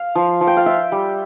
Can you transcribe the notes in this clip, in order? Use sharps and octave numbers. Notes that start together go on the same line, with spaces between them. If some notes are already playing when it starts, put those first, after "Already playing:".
Already playing: F5
F3
F3
G5
F5
F4 E5
G3